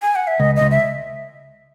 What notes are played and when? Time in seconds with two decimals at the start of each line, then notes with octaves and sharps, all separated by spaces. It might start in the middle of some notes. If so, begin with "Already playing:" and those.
0.02 G#5
0.15 F#5
0.27 E5
0.40 C#2 D#5
0.56 D#5
0.61 C#2
0.71 E5